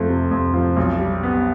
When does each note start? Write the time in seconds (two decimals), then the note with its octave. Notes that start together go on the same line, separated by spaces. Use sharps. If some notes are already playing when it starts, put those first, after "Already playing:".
Already playing: F2 F3 A3
0.09 C3
0.31 F2
0.54 F3
0.76 B1
0.99 G3
1.23 B3